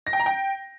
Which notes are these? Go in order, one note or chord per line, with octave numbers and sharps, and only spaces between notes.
A#6
G5
A#5
G5